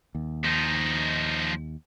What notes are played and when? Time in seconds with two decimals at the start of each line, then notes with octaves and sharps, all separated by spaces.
0.15 D#2
0.44 F3 D#4